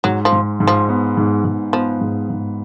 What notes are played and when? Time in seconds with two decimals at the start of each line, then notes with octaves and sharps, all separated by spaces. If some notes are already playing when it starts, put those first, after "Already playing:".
0.04 G#2 F#3
0.25 F3
0.32 G#2
0.60 G#2
0.67 F3
0.89 B3
1.17 G#2
1.45 G#2
1.73 F3 B3
2.01 G#2
2.30 G#2